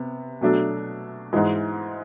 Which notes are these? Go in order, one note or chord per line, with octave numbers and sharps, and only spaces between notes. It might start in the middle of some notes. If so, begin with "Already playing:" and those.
Already playing: C3 B3
B2 F#3 A3 D4
G#2 E3 G#3